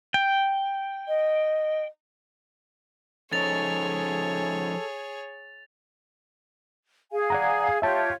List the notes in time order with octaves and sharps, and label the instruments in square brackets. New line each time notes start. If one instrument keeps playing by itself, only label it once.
[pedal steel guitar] G5
[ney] D#5
[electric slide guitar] F3 C#4 D#4 [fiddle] G#4 C#5 [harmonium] A4 [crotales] A6 F7
[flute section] G#4 F5 G#5
[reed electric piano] D5 F#5 A#5
[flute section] F4 G4 C#5 [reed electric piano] E5 A5